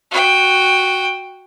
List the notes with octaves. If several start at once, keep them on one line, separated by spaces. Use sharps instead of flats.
F#4 G5